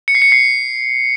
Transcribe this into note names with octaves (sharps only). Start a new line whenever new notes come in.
C#7
C7
C#7
C7